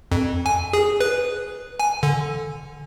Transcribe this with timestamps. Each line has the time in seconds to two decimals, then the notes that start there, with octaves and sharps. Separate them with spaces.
0.11 F2
0.46 G#5
0.73 G#4
1.00 B4
1.79 G#5
2.03 D3